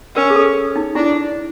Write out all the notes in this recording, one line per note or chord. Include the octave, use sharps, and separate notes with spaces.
C#4 A#4
G#4
A4
D#4
D4 E4